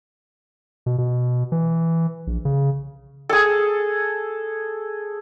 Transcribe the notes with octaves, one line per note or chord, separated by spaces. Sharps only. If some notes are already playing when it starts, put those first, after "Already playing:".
B2
B2
E3
A#1
C#3
G#4 A4